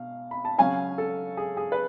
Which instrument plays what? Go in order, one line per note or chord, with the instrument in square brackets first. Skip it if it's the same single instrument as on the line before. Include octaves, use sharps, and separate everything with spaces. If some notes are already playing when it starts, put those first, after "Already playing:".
Already playing: [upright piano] B2 F5
B5
A5
C#3 F#3 C#4 F5 G#5
A4
G#4
G#4
B4